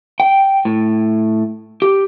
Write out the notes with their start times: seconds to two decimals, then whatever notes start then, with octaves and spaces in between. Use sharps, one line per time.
0.20 G5
0.65 A2
1.82 G4